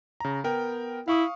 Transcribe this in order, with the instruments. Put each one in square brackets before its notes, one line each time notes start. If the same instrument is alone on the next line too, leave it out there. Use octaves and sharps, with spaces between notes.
[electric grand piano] C#3 A#5
B3 A#4 G5
[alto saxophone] E4 [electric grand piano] F5 C#6 D#6